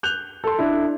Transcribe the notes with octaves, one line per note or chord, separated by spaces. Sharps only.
F#6 G6 F7
A4 C6
D4 E4